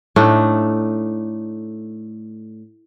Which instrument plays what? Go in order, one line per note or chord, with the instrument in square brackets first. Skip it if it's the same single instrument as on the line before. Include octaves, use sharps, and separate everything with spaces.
[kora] A2 A3 D4 D#4